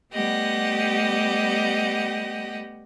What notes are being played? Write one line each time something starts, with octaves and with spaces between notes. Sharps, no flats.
G3 A3 B3 G4 D#5 F#5